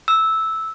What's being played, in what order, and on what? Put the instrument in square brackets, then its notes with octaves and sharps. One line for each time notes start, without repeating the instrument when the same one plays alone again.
[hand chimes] E6